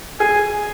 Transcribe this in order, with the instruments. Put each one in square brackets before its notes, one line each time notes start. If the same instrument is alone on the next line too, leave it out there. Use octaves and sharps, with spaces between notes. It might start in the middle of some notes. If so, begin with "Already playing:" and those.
[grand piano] G#4 [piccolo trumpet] G#5